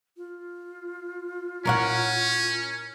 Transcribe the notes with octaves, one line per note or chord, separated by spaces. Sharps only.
F4
A#2 C#4 E4 A#4 C#5 F#5